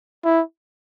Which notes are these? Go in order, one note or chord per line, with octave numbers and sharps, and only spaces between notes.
E4